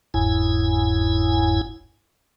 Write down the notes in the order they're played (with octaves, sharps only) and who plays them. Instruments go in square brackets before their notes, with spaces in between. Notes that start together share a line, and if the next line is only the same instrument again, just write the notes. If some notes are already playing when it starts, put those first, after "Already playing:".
[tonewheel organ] F#1 E2 G#2 E4 G#5